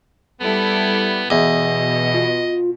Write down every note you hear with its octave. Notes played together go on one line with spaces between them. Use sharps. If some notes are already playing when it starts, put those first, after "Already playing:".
G3 B3 E4 A4
E2 B2 D#5
F4